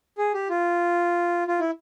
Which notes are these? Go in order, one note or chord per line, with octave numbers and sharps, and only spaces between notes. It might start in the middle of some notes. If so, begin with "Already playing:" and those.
G#4
G4
F4
F4
E4